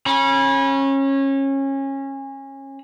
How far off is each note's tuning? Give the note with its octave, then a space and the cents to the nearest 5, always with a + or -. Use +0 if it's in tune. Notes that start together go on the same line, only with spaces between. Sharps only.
C#4 -25 B5 -30